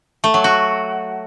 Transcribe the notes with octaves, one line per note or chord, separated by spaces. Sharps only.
A3
F#3
F#4